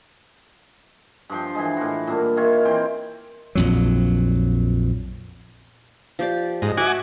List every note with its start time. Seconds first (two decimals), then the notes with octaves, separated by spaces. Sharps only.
1.29 G2 F3 G5
1.55 E3 G#3
1.77 A2 F#4
2.07 A#2 G3 D4
2.37 D#3 E4 F4 C#5
2.65 E3 C4 G5 C6
3.55 A#1 F2 F#3
6.19 F3 G4 D5
6.62 G#2 D#5
6.77 F#4 E5 F#5 G#5 D6